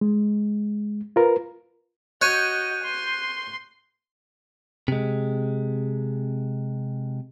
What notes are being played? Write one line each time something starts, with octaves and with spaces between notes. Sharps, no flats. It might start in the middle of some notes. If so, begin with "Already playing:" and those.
G#3
F4 A#4 B4
F#4 C#5 D#5 F#6 G6 D#7
C6
C3 G#3